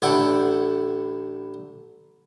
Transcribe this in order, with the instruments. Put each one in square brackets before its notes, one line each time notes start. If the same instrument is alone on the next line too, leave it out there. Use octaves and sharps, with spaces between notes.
[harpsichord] A1 D3 E4 F#5 G5